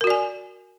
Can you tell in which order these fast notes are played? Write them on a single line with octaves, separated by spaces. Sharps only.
A#4 F#4 D5 G#5